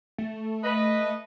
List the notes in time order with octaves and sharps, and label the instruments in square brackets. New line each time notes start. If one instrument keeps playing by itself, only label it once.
[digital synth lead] A3
[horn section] B4 D#5